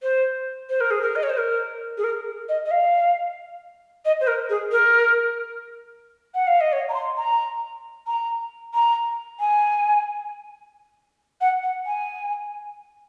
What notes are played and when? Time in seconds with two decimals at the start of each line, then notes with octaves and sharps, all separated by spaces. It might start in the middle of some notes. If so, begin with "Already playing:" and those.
0.03 C5
0.70 C5
0.81 A#4
0.91 G#4
1.02 A#4
1.16 D#5
1.23 C#5
1.30 C5
1.38 A#4
1.98 G#4
2.04 A#4
2.49 D#5
2.66 D#5
2.71 F5
4.05 D#5
4.21 C5
4.27 A#4
4.50 G#4
4.72 A#4
6.34 F#5
6.47 F5
6.61 D#5
6.72 C#5
6.89 A#5
6.94 C6
7.17 A#5
8.07 A#5
8.74 A#5
9.40 G#5
11.41 F#5
11.63 F#5
11.86 G#5